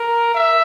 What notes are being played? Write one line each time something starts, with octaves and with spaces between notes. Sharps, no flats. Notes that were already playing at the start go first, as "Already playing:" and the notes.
Already playing: A#4
E5